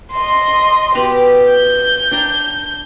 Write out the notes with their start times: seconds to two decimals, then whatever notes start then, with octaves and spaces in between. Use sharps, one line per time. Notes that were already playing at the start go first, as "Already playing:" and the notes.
0.11 D#5 C6
0.95 B2 G4 B4 A#5
1.50 G6
2.11 D4 G5 A#5